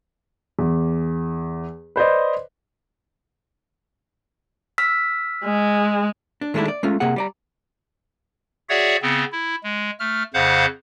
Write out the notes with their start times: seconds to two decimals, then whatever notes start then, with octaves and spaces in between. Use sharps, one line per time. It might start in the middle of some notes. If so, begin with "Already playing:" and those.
0.59 E2
1.96 B4 C5 D5 D#5
4.78 E6 F6 B6
5.44 G#3
6.41 D4
6.54 D#3 G#3 A3 C#4 D4 E4
6.68 D5
6.83 G#3 A3 C#4 F4
7.00 C3 A#3 G#4 F#5
7.16 G3 D5 A#5
8.69 F#4 G#4 C#5 D5 E5 F#5
9.02 C#3 B3 C4
9.32 E4
9.63 G#3
10.00 A3 F6
10.34 F2 C#3 C5 F5 F#5 F#6